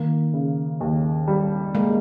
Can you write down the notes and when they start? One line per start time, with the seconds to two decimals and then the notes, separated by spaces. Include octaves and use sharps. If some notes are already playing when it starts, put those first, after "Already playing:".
Already playing: D#3 A#3
0.34 C#3
0.81 D#2
1.28 G3
1.75 G#3 A#3